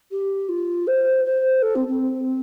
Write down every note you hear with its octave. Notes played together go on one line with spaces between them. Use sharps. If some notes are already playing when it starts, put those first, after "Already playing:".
G4
F4
C5
C5
A4
C4
C4